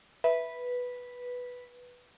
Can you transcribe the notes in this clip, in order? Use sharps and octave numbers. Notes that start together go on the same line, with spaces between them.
B4 E5